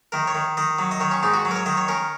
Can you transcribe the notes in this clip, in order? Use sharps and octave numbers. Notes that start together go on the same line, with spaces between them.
D#3 A#4
C#5
D#3
D#3 D#5
F#3
D#5
D#3 C#5
C#4
G#2 D#4
F#4
F#3
A#4
C#5
D#3 D#5
C#5
C#4 A#4